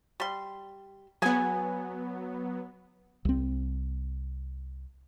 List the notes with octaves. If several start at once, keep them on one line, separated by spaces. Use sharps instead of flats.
G3 C6
F#3 B3 G#4 G#5
C2 C4